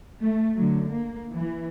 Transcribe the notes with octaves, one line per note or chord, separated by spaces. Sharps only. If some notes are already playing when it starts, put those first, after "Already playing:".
A3
D3 F#3
A#3
E3